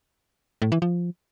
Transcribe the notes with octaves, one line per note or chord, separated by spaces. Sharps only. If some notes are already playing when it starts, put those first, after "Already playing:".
A2
E3
F3